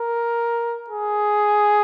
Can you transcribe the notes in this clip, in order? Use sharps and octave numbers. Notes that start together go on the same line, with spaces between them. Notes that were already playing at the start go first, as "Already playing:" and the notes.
Already playing: A#4
G#4